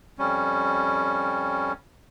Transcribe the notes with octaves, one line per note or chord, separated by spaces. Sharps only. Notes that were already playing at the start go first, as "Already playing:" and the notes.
F2 G3 C#4